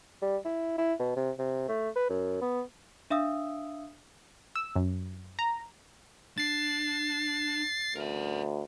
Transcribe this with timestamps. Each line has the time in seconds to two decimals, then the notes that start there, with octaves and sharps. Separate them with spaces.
0.22 G3
0.45 E4
0.78 E4
0.99 B2
1.16 C3
1.39 C3
1.68 A3
1.95 B4
2.09 F#2
2.41 B3
3.10 D4 E5 F5 D#6 E6
4.56 E6
4.76 F#2
5.39 A#5
6.38 D4 A6 C7
7.96 D2 A#4 E5